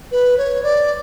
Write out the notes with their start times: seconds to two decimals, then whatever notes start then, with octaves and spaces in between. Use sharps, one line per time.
0.12 B4
0.38 C#5
0.63 D5